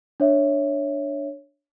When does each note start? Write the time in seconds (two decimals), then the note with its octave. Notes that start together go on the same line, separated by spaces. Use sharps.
0.20 D4 C#5 E5